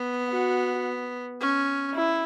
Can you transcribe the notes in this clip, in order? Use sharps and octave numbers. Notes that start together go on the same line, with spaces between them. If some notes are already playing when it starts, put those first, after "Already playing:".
Already playing: B3
F#4
C#4
E4